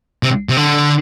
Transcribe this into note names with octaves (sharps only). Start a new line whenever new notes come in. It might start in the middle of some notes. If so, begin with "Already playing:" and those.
C3
C3
D3